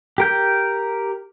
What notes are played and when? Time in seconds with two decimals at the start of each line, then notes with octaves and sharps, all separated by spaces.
0.18 G4 A#4 G6